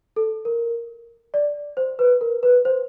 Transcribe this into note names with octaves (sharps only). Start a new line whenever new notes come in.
A4
A#4
D5
C5
B4
A#4
B4
C5